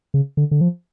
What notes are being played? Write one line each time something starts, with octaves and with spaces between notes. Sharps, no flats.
C#3
D3
D3
F3